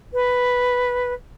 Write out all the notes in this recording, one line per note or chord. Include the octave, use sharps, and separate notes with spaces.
B4